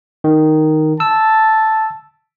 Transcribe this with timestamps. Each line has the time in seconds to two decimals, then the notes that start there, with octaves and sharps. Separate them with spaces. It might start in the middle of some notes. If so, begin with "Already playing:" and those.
0.24 D#3
1.00 A5 E6